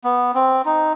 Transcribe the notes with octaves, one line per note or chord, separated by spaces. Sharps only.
B3
C4
D#4